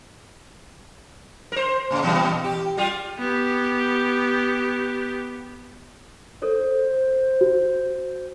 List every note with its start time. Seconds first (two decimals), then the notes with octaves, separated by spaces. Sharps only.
1.52 A#4 C5
1.91 A2 C#3
2.03 A#2 E3 G3
2.44 G4
2.77 G3 F4 G4
3.19 B3 G4
6.42 A4 A#4 C5 C#5
7.41 F#4